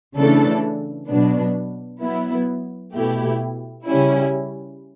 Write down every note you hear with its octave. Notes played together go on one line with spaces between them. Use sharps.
C#3 E3 A3 D4 A4
B2 F#3 B3 D4
F#3 B3 E4
B2 A3 E4 G4
C#3 G3 C#4 E4